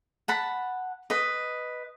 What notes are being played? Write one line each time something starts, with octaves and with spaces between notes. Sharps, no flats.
F#5 A5 B5
B4 D#5